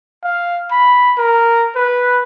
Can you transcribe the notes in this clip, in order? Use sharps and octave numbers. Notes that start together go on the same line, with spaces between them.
F5
B5
A#4
B4